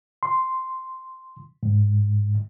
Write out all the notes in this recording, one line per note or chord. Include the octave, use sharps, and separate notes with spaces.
C6
G#2